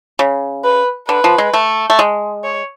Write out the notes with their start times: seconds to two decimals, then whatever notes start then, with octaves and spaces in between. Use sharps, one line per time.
0.19 C#3
0.64 B4
1.08 D3 B4
1.24 F3
1.38 G#3
1.53 A3
1.90 A3
1.99 G#3
2.44 C#5